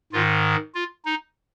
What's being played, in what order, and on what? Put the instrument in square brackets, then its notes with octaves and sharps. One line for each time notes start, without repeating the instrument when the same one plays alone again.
[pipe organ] G#2 D#3 F4
F4
D#4